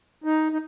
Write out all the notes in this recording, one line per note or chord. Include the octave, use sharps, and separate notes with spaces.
D#4
D#4